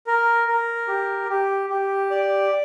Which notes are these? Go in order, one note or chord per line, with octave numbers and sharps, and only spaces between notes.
A#4
A#4
G4
G4
G4
D5